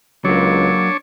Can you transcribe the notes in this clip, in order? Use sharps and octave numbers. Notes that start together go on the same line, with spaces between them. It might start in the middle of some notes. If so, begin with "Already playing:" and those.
C#2 F#3 A#3 D4 C#5